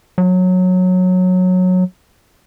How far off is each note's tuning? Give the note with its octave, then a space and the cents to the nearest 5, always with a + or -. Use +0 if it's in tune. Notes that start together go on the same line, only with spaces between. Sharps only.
F#3 -15